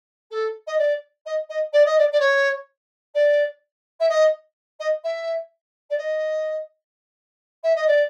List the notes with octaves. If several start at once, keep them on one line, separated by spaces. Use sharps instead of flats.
A4
D#5
D5
D#5
D#5
D5
D#5
D5
D5
C#5
D5
E5
D#5
D#5
E5
D5
D#5
E5
D#5
D5